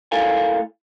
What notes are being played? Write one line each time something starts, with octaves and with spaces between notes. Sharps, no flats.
A2 E4 A4 A#4 F5 G#5